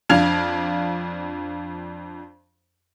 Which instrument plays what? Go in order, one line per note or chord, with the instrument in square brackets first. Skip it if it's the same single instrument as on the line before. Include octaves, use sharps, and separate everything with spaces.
[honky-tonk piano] F2 D4 F5 G#6 F7